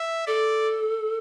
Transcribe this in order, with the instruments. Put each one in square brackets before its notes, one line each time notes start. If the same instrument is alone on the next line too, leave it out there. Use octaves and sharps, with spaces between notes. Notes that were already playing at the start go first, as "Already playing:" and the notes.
Already playing: [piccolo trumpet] E5
[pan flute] A4 [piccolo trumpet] D5